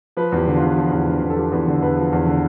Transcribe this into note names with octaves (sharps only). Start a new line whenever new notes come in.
F3 B4
E2
G4
D3
F4
E2
F3
E2
D3
E2
A4
F3 G4
E2 B4
D3
E2 B4
F3
E2
D3